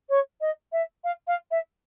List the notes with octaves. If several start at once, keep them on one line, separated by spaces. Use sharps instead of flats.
C#5
D#5
E5
F5
F5
E5